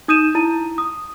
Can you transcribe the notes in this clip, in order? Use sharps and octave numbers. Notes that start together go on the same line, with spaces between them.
D#4 D#6 G6 D#7 E7
E4 A5 A#5 D#7
D#6